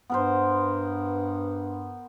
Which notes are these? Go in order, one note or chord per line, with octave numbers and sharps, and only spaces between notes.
G2 B3 A#4 C5